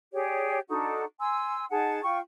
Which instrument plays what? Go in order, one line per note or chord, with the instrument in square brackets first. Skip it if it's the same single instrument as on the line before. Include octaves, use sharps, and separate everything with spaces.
[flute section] G4 G#4 C#5 D5
D4 D#4 F#4 A4
G#5 C6 E6
D#4 G#4 F#5 A5
F4 G5 C#6